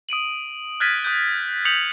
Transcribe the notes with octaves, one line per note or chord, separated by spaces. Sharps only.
D#6 D7 D#7 F#7
F6 F#6 G#6 A6 B6 D#7
D#6 F#6 G6
D#6 G6 B6 C#7 F7 F#7